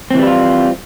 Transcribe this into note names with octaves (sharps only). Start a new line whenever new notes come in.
E3 G3 C4 E4 F4